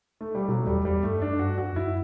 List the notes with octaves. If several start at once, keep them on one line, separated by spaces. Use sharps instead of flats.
A3
G3
B2 F#3
A3
E2 G3
E2 G3
G2 A3
F#2 D4
G2 F#4
F#2 F#4
F#2 E4